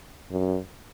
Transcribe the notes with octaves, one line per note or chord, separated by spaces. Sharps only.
F#2